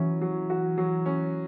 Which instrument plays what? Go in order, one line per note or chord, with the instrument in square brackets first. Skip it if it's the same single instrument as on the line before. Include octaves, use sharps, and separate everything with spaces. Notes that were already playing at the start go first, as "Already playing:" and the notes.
Already playing: [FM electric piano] E3 E4 [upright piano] F#3 C#4
[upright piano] F#3
F#4
F#3
C#4